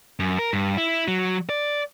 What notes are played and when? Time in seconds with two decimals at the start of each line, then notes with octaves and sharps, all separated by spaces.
0.20 F#2
0.39 A#4
0.53 G2
0.77 E4
1.08 F#3
1.49 D5